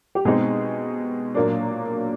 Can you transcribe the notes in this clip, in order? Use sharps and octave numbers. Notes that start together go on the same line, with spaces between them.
G4
B2 G#3 C4 D#4 G#4
A#2 F#3 A#3 D4